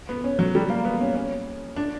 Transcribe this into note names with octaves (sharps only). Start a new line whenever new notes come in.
B3
C#4
F#3
G3
A#3
B3
C#4
C#4
D4